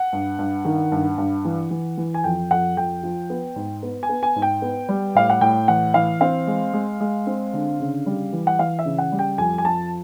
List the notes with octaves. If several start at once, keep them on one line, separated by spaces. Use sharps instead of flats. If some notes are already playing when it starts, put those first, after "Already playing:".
Already playing: F#5
G2
G2
D#3
G2
G2
E3
E3
E3
G#5
F2 G5
F2 F#5
F2 G5
F3
B3
G#2
B3
G#5
B3
G#5
G#2
G5
B3
G3
A2 F5
F#5
A2 G5
E3 F#5
E3 F5
C4 F5
G#3
G#3
G#3
C4
D3
C#3
G3
E3
F#5
E3 F5
E5
C#3
F#5
G3
G5
F2 G#5
G#5
F3 A5